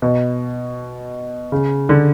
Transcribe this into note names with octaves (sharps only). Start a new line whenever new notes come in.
B2
C#3
D3